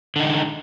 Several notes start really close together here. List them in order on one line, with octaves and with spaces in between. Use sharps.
D3 D#4 G#3 D#3